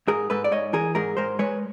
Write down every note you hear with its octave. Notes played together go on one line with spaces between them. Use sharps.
G#2 G#4 A#4
G#2 A4 B4
D5
G#2 C#5 D#5
E3 G#4 A#4
G#2 G#4 A#4
G#2 A#4 C5
G#3 B4 C#5